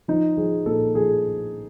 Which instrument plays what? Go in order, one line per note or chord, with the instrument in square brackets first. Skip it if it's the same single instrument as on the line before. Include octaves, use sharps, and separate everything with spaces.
[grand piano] F3 D#4
F3 G#4
A#2 A4
F3 G#4